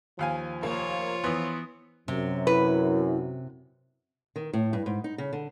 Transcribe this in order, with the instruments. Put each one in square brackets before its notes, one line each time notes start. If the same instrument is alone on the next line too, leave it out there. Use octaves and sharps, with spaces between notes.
[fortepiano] D#2 F5 G#5 [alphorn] F3
[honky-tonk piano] F1 A#3 [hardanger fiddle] F4 C#5
[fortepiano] E3 B3 [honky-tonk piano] C6 D#6
[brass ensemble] F#2 [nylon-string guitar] C3
[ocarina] E4 [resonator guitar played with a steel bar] B4
[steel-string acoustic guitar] D#3
A2
G2
G#2
D#4
C#3
D3